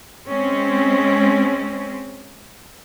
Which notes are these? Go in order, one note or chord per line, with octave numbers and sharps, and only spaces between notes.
G#3 C4 C#4